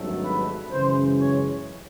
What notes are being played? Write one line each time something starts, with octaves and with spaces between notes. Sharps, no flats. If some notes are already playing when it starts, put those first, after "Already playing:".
Already playing: G#1 G2 D#3 F#3 A3
B4
F#2 C#3 E3 G#3 C#4 C5
C#5